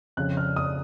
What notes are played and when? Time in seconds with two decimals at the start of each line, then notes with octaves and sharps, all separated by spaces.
0.17 F2 C#3 F#6
0.37 F6
0.56 D#6